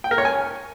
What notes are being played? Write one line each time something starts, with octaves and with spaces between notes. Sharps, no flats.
G5
A#4
C#5
G#5